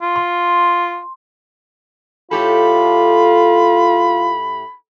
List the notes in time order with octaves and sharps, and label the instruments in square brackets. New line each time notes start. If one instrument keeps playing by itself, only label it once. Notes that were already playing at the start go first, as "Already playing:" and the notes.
[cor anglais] F4
[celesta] C6
[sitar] A2 G4 A4 [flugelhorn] F4 [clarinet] B5